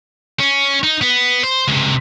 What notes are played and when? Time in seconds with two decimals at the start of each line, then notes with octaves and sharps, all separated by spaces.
0.40 C#4
0.83 D#4
1.01 B3
1.43 C5
1.68 C#2 C3